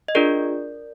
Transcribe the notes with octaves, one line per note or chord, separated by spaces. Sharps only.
D#5
D4 F4 G#4 A#4 D5